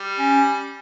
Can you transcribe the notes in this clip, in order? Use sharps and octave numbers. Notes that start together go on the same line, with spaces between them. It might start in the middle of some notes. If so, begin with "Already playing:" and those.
Already playing: G3
C#4